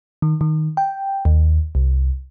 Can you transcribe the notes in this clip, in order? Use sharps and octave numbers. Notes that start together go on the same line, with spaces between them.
D#3
D#3
G5
D#2
C2